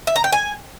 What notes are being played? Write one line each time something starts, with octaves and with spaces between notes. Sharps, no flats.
E5
A#5
G5
G#5